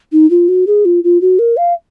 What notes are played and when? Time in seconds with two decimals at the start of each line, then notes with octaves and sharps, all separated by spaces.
0.12 D#4
0.30 F4
0.48 F#4
0.67 G#4
0.85 F4
1.04 F4
1.21 F#4
1.39 A#4
1.57 F5